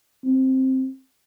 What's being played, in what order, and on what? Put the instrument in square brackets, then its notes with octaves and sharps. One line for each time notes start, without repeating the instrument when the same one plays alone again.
[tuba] C4